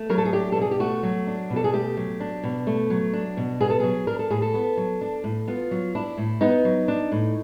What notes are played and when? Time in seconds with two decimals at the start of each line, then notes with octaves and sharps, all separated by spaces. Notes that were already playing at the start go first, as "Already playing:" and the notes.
Already playing: A3
0.09 F#3 A#4
0.18 A4
0.25 G#4
0.33 D4 G4
0.52 A4
0.56 B2
0.62 G#4
0.71 G4
0.80 A3 F#4
1.03 F#3
1.27 D4
1.50 B2
1.56 A4
1.64 G#4
1.73 A3 G4
1.97 F#3
2.20 D4
2.44 B2
2.67 A3
2.90 F#3
3.13 D4
3.37 B2
3.61 B3 G#4
3.70 A4
3.80 F#3 G#4
4.07 D4 A#4
4.19 A4
4.30 A2 G#4
4.42 A4
4.54 B3
4.77 F#3
5.01 D4
5.24 A2
5.47 B3 F4
5.71 F#3
5.95 D4 E4
6.17 A2
6.41 B3 D#4
6.65 F#3
6.88 D4
7.12 A2